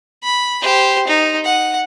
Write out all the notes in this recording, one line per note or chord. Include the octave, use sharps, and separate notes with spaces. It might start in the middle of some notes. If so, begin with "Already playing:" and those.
B5
G4 C5
D#4
F#5